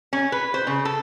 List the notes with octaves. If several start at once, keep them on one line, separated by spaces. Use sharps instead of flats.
C#4
B4
C5
C#3
A4